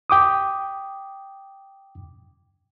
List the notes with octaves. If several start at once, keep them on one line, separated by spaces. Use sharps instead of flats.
G5 D6 D#6